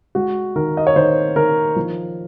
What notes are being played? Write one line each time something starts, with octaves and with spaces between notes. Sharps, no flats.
G#3 F#4
D#3 A#4
D#5
C#5
D#3 C5
D#3 A#4
F3